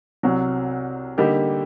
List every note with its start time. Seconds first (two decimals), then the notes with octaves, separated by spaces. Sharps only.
0.23 C2 C3 F#3
1.18 D3 G3 A#3 D#4 G4